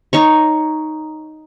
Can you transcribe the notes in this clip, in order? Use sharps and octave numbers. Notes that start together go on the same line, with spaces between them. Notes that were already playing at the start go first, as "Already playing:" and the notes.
D#4 C#5 C#6